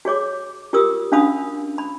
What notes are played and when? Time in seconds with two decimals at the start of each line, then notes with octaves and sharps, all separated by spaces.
0.05 F#4 G#4 C#5 D6
0.73 F4 G4 A#4 D#6 E6
1.12 C#4 D4 F#4 F5 B5 D#6
1.78 B5